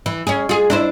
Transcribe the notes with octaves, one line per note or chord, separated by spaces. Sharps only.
E3
C#4 G#4
F4 G#4
D4 E4 C5